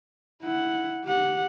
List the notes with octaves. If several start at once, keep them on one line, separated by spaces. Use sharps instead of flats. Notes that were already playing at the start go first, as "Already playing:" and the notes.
E4 F#5
G4 F#5